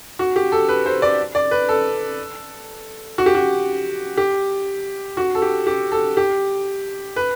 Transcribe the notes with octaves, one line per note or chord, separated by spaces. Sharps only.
F#4
G4
A4
B4
C5
D5
D5
B4
A4
F#4
G4
F#4
G4
F#4
A4
G4
G4
A4
G4
B4